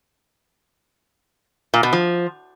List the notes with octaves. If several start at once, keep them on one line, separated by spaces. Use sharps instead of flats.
A#2
B2
F3